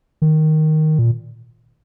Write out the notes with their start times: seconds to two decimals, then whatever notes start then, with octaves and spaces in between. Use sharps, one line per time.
0.22 D#3
0.99 A#2